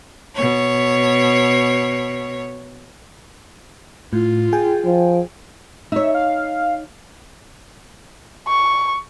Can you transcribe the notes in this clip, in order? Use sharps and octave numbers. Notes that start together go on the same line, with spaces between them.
B2 C#5
A2 F4
G#4 G5 G#5
F3
D#4 C#5 E5
F5
C#6